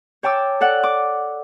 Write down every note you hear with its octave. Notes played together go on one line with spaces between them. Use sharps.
C#5 G5 A5 D6 E6
A4 D5 F#5
D6